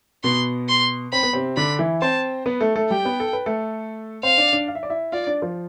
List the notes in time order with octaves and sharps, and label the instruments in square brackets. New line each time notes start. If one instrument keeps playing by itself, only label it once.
[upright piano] B2 B3 [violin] C6
[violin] C6
[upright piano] C4 [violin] B5
[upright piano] B3
C3 C4
[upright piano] D3 D4 [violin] B5
[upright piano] E3 E4
[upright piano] C4 C5 [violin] A5
[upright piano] B3 B4
A3 A4
A3 A4
[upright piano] G3 G4 [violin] G5
[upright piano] B3 B4
A4
B4
A3 A4
[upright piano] C4 C5 [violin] F5
[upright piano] D4 D5
D4 D5
F5
E5
D5
E4 E5
[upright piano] F4 F5 [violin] D5
[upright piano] D4 D5
F3 F4